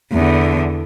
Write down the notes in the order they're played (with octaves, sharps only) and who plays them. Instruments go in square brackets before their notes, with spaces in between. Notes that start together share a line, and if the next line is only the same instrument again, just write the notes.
[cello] E2 D3